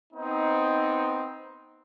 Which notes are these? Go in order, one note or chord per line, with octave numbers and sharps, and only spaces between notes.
B3 C4 D#4